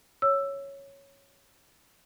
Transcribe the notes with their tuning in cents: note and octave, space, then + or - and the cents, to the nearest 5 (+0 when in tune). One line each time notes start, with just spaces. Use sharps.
C#5 +0 E6 +10